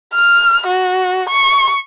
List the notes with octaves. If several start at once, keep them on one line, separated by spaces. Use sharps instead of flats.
F6
F#4
C#6